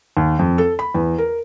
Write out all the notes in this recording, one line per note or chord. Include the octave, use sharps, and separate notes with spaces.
D#2
F2
A4
B5
E2
A#4